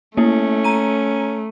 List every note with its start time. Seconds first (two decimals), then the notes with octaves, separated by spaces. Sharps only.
0.17 A3 A#3 C#4 E4
0.64 A#5 D#7